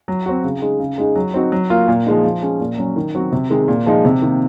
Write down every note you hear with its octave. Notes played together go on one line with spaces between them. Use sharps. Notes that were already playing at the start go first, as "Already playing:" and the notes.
F#3
C4 F#4
C#3
G#3 D#4 G#4
C#3
G#3 D#4 G#4
F#3
C4 D#4 F#4
F#3
A#3 F4
A#2
F3 G#3 D#4
F3
G#3 C#4
A#2
F#3 C#4
D#3
F#3 C4 F#4
C3
D#3 G#3
A#2
F3 G#3 D#4
C3
D#3 A#3